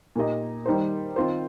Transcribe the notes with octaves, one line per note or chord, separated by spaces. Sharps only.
A#2 A#3 D#4 G4 D#5
D#3 G3 D#4 C5
D#3 C4 F4 C5